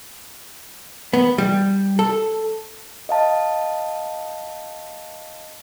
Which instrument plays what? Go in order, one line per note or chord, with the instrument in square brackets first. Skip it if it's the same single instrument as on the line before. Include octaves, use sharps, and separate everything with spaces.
[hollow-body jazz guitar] B3
G3
A4
[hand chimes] D#5 F5 A5